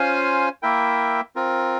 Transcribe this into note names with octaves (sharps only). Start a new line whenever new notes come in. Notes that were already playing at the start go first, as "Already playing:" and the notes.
Already playing: C#4 F4 C5 F5 G#5
A#3 E4 A#4 E5 G5
C4 F4 A#4